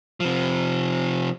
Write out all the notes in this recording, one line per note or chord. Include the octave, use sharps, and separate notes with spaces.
C3 F3